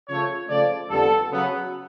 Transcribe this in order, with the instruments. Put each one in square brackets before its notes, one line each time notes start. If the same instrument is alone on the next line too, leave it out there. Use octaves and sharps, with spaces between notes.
[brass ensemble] C#3 F3 A3 C#5
C#3 F3 A3 D5
F2 D3 G3 B3 A4
C#3 F#3 B3